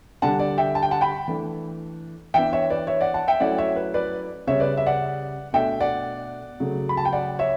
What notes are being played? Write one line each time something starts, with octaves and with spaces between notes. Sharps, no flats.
D3 G3 D4 F#5 A5
D5 F#5
E5 G5
A5
G5
F#5 A5
G5 B5
E3 A3 D4
E3 B3 D4 E5 G5
C#5 E5
B4 D5
C#5 E5
D5 F#5
F#5 A5
E5 G5
F#3 A3 C#4 E4 D5 F#5
C#5 E5
B4
B4 D5
C#3 G3 C#4 C#5 E5
B4 D5
E5
D5 F#5
B2 A3 D4 E5 G5
D5 F#5
C#3 F#3 A3
B5
A5
G5
D5 F#5
C#5 E5